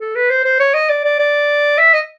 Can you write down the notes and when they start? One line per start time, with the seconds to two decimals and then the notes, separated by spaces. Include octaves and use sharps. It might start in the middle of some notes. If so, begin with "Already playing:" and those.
0.01 A4
0.16 B4
0.30 C5
0.44 C5
0.60 C#5
0.74 D#5
0.89 D5
1.04 D5
1.19 D5
1.78 E5
1.94 D#5